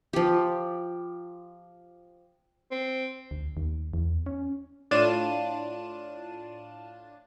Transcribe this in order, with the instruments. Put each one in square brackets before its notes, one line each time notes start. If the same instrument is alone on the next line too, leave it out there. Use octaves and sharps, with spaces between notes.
[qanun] F3 G4
[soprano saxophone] C4
[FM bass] D2
D#2
E2
C#4
[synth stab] A2 D4 F4 A5 D#7 E7